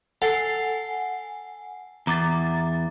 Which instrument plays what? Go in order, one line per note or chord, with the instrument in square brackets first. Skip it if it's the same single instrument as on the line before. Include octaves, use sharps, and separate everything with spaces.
[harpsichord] A4 [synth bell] F#5 G#5 C7
[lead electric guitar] E2 [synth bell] A#5 D6 A6